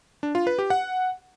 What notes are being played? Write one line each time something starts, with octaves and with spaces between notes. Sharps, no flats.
D4
F4
B4
G4
F#5